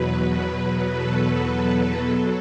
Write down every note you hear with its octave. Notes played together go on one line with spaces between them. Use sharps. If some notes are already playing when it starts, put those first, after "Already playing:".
Already playing: E2 B2 F#3 B4
A4
A4
F#3